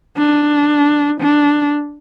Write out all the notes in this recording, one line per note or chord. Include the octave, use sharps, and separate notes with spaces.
D4
D4